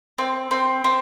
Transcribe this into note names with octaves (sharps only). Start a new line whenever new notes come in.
C4
C4
C4